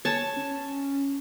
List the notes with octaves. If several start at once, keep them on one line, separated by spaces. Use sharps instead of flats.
C#5 A5
C#4